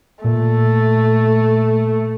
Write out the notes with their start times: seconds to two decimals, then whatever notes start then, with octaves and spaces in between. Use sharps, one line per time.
0.24 A#2 A3